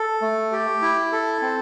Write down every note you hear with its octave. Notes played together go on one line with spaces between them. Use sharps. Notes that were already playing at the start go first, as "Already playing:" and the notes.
Already playing: A4
A3
G4
E4
A4
C4